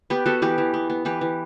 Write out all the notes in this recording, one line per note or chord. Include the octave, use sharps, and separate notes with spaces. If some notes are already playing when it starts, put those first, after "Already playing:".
B3 G4 B4
B3 F#4 A4
E3 G4 B4
E3
B3
B3
E3 G4 B4
E3